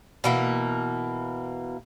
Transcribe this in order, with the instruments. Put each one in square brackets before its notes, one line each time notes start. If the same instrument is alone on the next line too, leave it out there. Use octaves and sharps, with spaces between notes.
[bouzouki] B2 E3 A#3